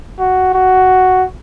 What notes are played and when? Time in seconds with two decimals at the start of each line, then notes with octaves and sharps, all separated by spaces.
0.19 F#4
0.54 F#4